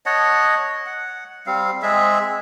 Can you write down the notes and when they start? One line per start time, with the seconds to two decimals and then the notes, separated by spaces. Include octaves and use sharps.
0.06 C#5 D#5 F#5 A5
0.86 F#5
1.46 G3 C4 F5
1.83 G#3 C4 G#4 E5